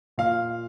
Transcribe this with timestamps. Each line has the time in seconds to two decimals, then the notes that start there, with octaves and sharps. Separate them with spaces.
0.18 A#2 F5